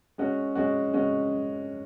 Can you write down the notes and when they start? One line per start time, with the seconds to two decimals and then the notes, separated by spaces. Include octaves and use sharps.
0.18 G#3 C#4 F#4
0.55 G#3 C#4 F#4
0.94 G#3 C#4 F#4